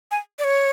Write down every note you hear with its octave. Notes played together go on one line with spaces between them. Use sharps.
G#5
D5
C#5